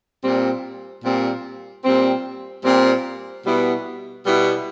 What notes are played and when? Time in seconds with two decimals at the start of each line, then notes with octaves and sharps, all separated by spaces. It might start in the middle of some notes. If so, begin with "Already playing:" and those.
0.23 A#2 G3 C4
1.04 A#2 G3 C4
1.84 A#2 G3 C4
2.64 A#2 G3 C4
3.46 B2 G3 B3 E4
4.26 B2 G3 B3 E4